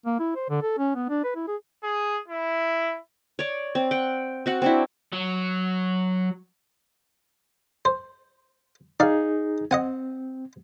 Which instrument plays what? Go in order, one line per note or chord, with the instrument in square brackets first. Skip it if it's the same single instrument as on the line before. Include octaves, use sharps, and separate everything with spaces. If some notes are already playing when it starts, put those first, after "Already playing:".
[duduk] A#3
E4
C5
D3
A4
C#4
B3
D4
B4
E4
G#4
[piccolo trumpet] G#4
E4
[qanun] C#5 D5
C4
F#5 G5
C4 F#4 F#5
C4 D4 E4
[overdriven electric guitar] F#3
[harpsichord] C5
[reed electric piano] D#4 G#4 [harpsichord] D5 F5
[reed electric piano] C4 [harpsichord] D#5 F#5 G#5